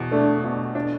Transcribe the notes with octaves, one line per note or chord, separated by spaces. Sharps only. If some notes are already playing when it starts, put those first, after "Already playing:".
Already playing: E2 B2
A3 D4
B2
D4